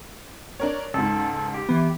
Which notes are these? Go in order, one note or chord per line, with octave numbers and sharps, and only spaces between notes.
D4 A#4 C#5
C#2 G#2 A4
G4
E3 B3